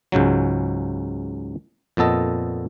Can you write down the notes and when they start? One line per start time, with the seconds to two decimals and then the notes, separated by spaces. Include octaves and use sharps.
0.12 C#2 G#2 C#3 F#3
1.97 F2 A#2 B3 A4 D#5